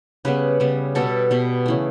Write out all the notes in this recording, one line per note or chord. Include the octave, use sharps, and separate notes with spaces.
C#3 G3 B3 B4
C#3 G3 B3
B2 G3 B3 A4
B2 G3 B3
C#3 E3 A3